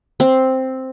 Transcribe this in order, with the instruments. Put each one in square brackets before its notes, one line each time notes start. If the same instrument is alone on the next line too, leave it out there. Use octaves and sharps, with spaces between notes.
[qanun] C4